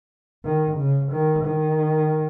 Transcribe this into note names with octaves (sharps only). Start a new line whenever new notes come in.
D#3
C#3
D#3
D#3